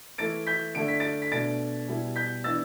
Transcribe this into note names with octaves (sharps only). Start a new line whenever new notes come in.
E3 A3 E4 A6 D7
G6 B6
D3 A3 D4 D7
B6
A6 D7
B6
B2 A3 D4 A6 D7
B2 G3 E4
G6 B6
E3 B3 D4 E6 A6